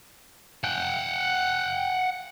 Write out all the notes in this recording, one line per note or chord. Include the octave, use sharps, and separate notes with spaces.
F#5 G5